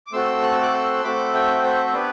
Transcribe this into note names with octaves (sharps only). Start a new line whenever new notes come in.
D6
A3 C4 F#4 A4 C6 E6
F#6
E6
D6 F#6
C6 E6
A3 C4 F#4 A4 B5 D6
E5 G5
C5 E5
C5
B3 D4 G4 B4 D5